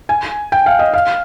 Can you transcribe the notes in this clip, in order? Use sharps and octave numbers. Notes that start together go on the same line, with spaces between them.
G#5
G5
F5
D#5
F5